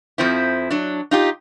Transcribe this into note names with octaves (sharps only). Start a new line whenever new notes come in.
F2 F3 C4 E4
F#3 D4
D#4 F4 G4